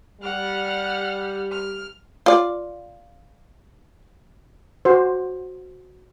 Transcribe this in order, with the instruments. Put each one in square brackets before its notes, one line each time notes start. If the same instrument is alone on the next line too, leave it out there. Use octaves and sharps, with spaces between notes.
[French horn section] G3 [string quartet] F#5 F6
[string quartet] F6
[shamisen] F4 D5
[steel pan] F#4 C5